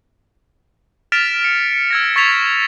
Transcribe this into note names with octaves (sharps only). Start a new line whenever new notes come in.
F6 A6 B6 D7 E7 F7
C#7
E6 G#6 A#6
C#6 G#6 A6 B6 E7 F7